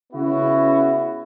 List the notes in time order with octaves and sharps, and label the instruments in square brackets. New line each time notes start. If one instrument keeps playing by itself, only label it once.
[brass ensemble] C#3 B3 E4 F#4